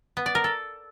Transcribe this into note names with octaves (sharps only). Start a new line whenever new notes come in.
B3
D5
A#4
A4